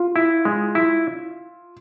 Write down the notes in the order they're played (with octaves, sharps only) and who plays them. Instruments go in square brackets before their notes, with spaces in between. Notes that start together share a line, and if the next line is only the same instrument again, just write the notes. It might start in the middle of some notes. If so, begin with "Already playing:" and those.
Already playing: [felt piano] F4
[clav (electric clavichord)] E4
G#3
E4